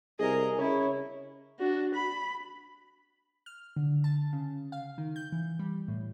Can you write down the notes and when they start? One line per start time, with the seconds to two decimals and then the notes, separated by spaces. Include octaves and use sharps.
0.19 C2 G#4 A#4 D#5
0.59 C#3 E4 C#5
1.59 D4 F#4
1.95 B5
3.46 F6
3.76 D3
4.04 A5
4.33 C#3
4.72 F5
4.98 D#3
5.16 G6
5.32 E3
5.59 G3
5.88 A2